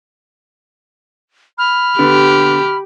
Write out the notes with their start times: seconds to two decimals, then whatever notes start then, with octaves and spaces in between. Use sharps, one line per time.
1.58 B5 F6
1.99 D3 B3 G4